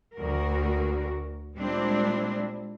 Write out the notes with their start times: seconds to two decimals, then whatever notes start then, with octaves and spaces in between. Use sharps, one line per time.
0.14 D2 F#4 A#4
1.57 A#2 G3 G#3 C4 D4 E4